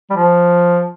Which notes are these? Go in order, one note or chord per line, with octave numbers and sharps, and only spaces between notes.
G3
F3